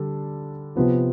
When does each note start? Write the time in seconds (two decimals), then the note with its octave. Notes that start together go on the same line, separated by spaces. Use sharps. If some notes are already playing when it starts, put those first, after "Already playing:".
Already playing: D3 G3 D4 A4
0.75 C3 F3 B3 F4